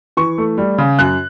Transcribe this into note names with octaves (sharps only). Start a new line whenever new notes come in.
E3 C#6
A3
G3
C#3
F#2 F#6